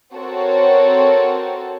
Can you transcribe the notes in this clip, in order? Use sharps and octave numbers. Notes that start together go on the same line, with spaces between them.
C4 F#4 A4 A#4 C#5